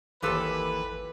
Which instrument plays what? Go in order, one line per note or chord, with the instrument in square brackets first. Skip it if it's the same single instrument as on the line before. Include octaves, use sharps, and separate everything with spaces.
[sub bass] G#1 [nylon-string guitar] D#2 G#2 E3 [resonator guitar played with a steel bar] F3 G4 A4 [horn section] B4